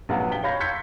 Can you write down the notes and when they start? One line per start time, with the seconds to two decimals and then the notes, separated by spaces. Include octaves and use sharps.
0.09 A#1 F#3 B4 F5 F#5
0.31 G5 B6 G7
0.44 C#5 F5 B5 C#6 G6 A#6
0.60 C6 E6 G6 G#6 B6 C#7